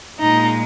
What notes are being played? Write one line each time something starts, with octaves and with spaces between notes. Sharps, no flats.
A#2 G#3 D#4